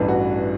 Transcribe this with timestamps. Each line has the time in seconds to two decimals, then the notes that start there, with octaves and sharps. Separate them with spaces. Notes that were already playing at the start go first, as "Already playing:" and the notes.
Already playing: A1 G2 E3
0.08 F#4